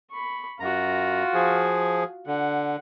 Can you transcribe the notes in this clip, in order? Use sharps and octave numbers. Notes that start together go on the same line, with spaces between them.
B5 C#6
F#2 F4 F#4 A#5
F3 G#4
D3 F#5